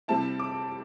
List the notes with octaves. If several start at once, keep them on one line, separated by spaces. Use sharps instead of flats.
C3 G3 C4 E4 A5
D6